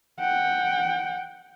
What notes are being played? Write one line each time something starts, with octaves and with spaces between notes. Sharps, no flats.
F#5 G5